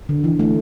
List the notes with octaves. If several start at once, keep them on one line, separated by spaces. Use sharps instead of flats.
D3
E3
A3